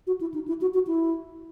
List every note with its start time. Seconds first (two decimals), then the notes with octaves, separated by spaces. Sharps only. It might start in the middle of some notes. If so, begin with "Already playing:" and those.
0.07 F#4
0.21 E4
0.34 D#4
0.48 E4
0.61 F#4
0.74 F#4
0.87 E4